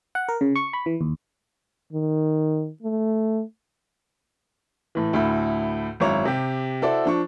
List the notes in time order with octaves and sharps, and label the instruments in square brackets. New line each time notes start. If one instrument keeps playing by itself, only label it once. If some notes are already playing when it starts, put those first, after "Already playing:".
[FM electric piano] F#5
A#4
C#3
C#6
B5
E3
D#2
[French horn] D#3
A3
[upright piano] A2 E3
D2 A2 E4 B5
G#1 F#2 E4 C#5 A#5
C3 G4
E4 F#4 A4 C5 D5
F3 D4 C#6